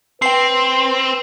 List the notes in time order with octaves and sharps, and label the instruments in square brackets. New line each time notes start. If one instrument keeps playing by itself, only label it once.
[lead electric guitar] C4 [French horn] B4 [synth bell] G5 C7